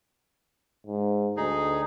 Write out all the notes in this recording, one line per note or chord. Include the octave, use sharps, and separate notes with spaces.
G#2
D2 D#4 G#4